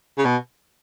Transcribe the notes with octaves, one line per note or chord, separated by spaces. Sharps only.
C#3
B2